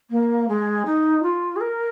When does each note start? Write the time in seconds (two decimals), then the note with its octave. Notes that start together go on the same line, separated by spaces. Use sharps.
0.11 A#3
0.49 G#3
0.85 D#4
1.23 F4
1.56 G#4
1.60 A#4